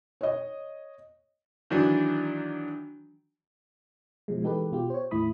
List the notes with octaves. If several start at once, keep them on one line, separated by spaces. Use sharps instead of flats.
C#5 D#5
D#3 E3 F#3 D4
B2 F3 G#3
E3 G#3 D#4 G4 A4 B4
B2 F4 G4
C5 C#5
D#2 A2 E4 B5 D#6